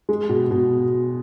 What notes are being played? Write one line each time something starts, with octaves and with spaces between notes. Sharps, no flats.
G#3
B2
B2